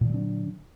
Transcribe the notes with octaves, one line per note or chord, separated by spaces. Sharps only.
A#2 D3 F#3 D4